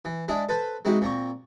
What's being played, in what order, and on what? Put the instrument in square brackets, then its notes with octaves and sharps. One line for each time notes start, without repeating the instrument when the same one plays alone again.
[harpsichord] E3
G#3 D4 E4 G#4
A4 B4 C5
G#3 C4 D#4 E4 F#4
A#2 C4 A#5 C#6